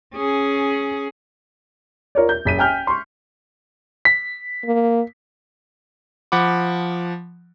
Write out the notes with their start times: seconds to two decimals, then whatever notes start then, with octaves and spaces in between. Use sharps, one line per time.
0.15 C#4 G#4
2.15 F4 A#4 C#5 D5
2.29 G6
2.45 F#1 B6 D#7
2.59 G5 G#5 F6 G6
2.87 C6 C#6
4.05 B6
4.65 A#3
6.32 F3 F#5 B5 D6